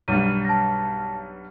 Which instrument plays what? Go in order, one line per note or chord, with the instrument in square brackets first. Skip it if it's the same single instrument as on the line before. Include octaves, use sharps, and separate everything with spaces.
[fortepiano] B1 G2 [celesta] D#7
[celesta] A5 A#6